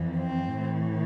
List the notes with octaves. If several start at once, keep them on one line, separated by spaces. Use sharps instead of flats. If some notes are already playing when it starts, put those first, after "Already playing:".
Already playing: F2 E3
C4
A2 E3